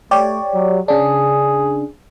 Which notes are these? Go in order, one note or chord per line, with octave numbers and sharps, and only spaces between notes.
A3 G4 C#5 D5
F#3
C#3 D4 G#4